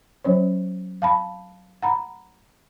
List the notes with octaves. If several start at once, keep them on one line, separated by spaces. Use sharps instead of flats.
F#3 C#4 C5 C#5
F5 A5 B5
F#5 A#5 B5